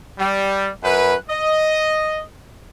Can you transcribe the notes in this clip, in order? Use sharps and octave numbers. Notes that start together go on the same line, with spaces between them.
G3
F#2 B4
D#5